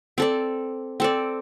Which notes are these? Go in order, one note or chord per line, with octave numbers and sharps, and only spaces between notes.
C4 A4 D5
C4 A4 D5